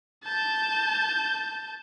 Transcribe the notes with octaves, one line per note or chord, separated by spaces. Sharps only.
A5 G6